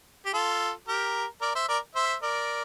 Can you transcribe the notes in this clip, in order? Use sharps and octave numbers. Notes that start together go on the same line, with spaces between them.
G4
F4 A4
G4 A#4
A#4 D5
C5 E5
A#4 D5
C5 E5
A#4 D5